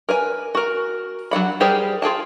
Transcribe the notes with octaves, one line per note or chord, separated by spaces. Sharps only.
A#4 B4 G#5
F#4 A#4
F#3 D4 F#5 B5
G3 G4 G#4 A#4 C5
F4 G#4 G5 A5